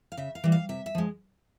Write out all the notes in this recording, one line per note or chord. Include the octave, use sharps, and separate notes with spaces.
F5
C#3 E5
F5
E3 G3
F5
C3 E5
E5
F3 G#3